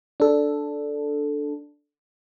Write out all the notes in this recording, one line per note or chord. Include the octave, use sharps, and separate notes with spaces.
D4 A4